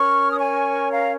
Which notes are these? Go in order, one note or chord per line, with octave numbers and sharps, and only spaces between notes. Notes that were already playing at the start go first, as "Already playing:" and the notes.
Already playing: C#4 A#4 C#5 C#6 F6
D#6
G#5 C#6
F5 A#5